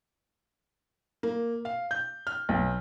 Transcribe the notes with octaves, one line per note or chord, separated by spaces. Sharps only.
A#3
F5
G6
F6
B1